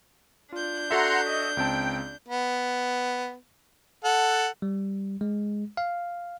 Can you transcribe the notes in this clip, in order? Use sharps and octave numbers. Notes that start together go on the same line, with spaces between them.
D4 F4 G6
F#4 A4 E5 F#5 A#5 C6
D#5
C#2 C4 G5 A5
B3
A4 F#5
G3
G#3
F5